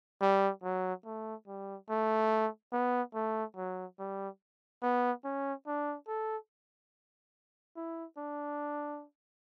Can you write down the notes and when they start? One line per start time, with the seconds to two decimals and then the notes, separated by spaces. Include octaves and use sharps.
0.21 G3
0.64 F#3
1.05 A3
1.47 G3
1.89 A3
2.73 B3
3.15 A3
3.56 F#3
3.99 G3
4.82 B3
5.24 C#4
5.67 D4
6.08 A4
7.76 E4
8.17 D4